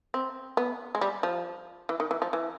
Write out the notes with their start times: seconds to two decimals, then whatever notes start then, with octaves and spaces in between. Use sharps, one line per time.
0.14 C4
0.57 B3
0.95 G#3
1.01 G3
1.23 F3
1.89 E3
2.00 D#3
2.11 E3
2.22 F3
2.33 E3